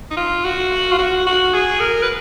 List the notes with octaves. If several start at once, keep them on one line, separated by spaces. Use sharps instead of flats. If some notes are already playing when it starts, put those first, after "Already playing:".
D#4
F4
F#4
F4
F#4
F#4
G#4
A#4
B4